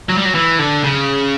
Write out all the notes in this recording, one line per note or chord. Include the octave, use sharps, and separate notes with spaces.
F#3
G3
F#3
E3
D3
C#3